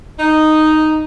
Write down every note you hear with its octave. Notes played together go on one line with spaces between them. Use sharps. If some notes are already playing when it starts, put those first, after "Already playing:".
D#4